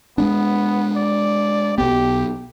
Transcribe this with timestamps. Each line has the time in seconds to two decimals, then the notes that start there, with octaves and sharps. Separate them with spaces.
0.18 G#3 A#3 B3 D4
0.96 D5
1.78 B1 B3 G4